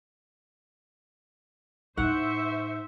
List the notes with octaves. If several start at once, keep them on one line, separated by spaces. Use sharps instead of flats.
A2 D#4 C5 E5 F#5 C#6